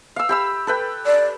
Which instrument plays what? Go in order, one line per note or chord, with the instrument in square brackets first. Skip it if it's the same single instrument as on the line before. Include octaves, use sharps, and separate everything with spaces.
[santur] F5 E6
G4 B5 E6
A4 B4 G5
[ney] D5